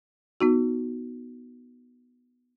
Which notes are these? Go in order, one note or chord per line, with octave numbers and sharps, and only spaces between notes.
B3 D#4 F#4